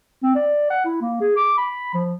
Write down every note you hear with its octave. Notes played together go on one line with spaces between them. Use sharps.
C4
D5
F#5
E4
A#3
G#4
D6
B5
F3